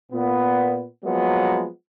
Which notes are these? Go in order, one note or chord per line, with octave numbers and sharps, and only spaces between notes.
A#2 B3
F3 F#3 G#3 A#3 B3